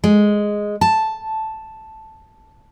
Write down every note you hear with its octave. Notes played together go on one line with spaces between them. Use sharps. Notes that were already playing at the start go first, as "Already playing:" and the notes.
G#3
A5